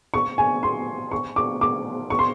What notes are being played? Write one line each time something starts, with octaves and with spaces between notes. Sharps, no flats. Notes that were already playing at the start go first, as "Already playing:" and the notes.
C#6
G#5
C6
C#6
D6
D6
C#6
C6